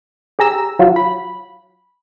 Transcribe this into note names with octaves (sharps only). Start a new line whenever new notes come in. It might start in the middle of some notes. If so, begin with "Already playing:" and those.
G4 G#4 A#5 E6
F#3 F4 F#4
B5